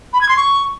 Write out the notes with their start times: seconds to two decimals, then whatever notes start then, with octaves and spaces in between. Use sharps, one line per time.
0.13 B5
0.21 G#6
0.29 C6
0.37 C#6